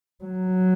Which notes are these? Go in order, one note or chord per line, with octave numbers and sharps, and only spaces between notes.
F#3